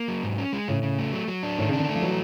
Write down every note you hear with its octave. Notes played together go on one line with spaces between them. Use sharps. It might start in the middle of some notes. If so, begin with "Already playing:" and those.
Already playing: A#3
F#3
G#2
C#4
G#3
A2 C#3
C#3
A3
F#3
F#3
D4
A2 D#3
C#3
D4
D3
A3
F3
E3 F#3